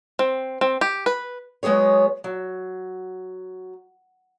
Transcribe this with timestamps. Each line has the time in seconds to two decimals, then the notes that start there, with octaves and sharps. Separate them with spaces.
0.19 C4
0.61 C4
0.81 G4
1.06 B4
1.63 F#3 G#3 B3 G#4 C#5
2.24 F#3